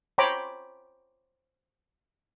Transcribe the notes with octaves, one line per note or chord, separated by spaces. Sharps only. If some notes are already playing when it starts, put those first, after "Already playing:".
C5 C#5 G5 A#5 B5 D6